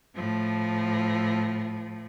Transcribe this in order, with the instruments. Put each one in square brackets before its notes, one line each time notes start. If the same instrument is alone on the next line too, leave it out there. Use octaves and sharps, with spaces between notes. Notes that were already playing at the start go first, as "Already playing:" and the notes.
[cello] A2 F3